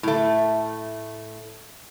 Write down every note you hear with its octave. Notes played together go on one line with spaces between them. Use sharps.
A2 A3